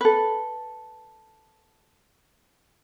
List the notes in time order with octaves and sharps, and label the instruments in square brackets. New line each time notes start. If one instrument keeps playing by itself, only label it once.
[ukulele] A4 B4